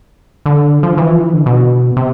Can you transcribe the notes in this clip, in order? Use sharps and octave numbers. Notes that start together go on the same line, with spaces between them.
D3
F3
E3
F3
E3
D3
B2
C3